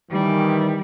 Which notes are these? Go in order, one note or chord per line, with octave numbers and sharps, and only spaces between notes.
D#3 E3 G3